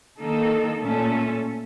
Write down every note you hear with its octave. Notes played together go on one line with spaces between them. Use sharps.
D#3 A#3 D#4 A4
A#2 A3 C#4 A4